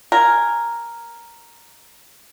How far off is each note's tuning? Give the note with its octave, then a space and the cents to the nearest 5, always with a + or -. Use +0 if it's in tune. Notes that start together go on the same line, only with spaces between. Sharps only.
A#4 +0 G#5 -5